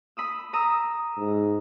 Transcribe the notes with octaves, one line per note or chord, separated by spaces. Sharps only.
B5 D#6 E6
A#5 D#6 E6
G#2